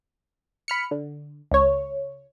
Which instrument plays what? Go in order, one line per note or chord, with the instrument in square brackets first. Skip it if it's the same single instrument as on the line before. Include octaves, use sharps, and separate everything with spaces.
[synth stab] B5 F6 C#7
D3
C#2 C#5